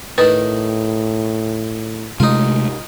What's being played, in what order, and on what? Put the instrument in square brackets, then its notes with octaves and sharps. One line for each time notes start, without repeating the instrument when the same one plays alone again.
[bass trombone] A2 [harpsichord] D#3 D#4 [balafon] B4
[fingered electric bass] C3 G#3 A3 [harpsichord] D#4 F4